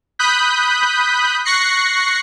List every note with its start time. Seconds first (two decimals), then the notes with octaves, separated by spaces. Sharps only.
0.19 B5 D#6 F#6 G6 B6
1.45 C#6 F#6 A#6 C7 C#7